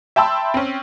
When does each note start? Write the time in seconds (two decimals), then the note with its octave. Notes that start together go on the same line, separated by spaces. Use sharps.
0.16 E5 G5 A5 B5 C6 E6
0.54 C4 C#4